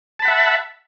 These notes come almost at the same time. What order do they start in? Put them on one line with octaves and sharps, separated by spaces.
A5 B5 F#5 E5